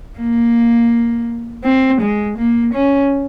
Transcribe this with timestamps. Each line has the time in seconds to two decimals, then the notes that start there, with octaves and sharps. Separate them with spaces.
0.19 A#3
1.65 C4
2.01 G#3
2.38 A#3
2.74 C#4